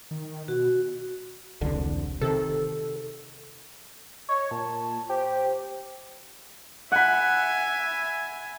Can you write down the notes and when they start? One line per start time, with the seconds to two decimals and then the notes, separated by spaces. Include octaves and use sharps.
0.11 D#3
0.48 B2 F#4
1.61 E1 C2 D3
2.21 C3 D#3 A4
4.29 C#5 D#5
4.51 A#2 A5
5.09 G4 C5
6.92 E5 F#5 G#5 B5